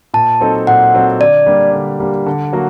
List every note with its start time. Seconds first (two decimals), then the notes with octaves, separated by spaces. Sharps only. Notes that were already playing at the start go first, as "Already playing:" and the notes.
0.14 A#2 A5
0.40 F#3 C4 D#4 A4
0.67 A#2 F#5
0.94 F#3 C4 D#4 A4
1.20 D3 D5
1.46 G3 A#3 D4 G4
1.73 D3
2.00 G3 A#3 D4 G4
2.26 D3
2.53 F#3 A#3 F#4